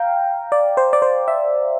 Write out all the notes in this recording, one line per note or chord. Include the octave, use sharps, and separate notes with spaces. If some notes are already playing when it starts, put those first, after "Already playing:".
Already playing: F5 G5 A#5
D5
C5
D5
C5
E5